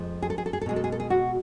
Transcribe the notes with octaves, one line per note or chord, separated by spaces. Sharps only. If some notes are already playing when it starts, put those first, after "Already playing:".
Already playing: F2 F3 G#3
G#4
A4
G#4
A4
G#4
A4
B2 G#3 G#4
A4
G#4
A4
G#4
F#4